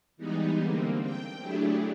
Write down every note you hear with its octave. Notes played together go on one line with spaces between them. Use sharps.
E3 G3 G#3 B3 D#4
D3 A#3 C4
G5
F#3 A3 D4 E4 G4 G#4